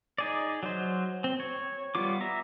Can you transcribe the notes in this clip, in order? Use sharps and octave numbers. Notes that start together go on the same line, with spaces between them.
D#4 G#4 D5
F#3 C5
C4
C#5
G3 B3 F4 D6
E5 A#5